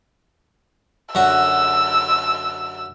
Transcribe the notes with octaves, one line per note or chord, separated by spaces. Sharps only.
F#2 D3 F#4 E6